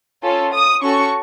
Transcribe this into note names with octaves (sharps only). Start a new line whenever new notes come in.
C#4 F4 A4
D#6
C#4 F#4 A4 C#6